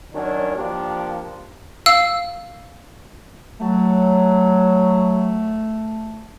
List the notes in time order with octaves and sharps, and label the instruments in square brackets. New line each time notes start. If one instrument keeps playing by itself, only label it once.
[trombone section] D#3 F#3 C#4 D4
F3 A#3 D4 G4
[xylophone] F5 E6
[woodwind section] F#3 [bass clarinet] A3